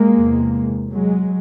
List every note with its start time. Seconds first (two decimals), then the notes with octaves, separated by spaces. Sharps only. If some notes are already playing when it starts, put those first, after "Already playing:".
Already playing: G#3 A#3
0.17 E2 C3
0.92 F#3 G#3